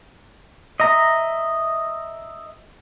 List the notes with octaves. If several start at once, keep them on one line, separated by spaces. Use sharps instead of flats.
D#5 E5 A#5